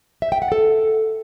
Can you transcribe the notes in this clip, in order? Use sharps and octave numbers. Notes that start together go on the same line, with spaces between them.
E5
G5
F#5
A4